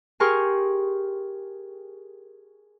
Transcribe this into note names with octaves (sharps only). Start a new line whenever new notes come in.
G4 G#4 A#4 C6 C#6 F6